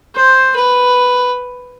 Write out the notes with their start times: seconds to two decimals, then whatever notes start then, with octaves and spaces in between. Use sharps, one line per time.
0.15 C5
0.56 B4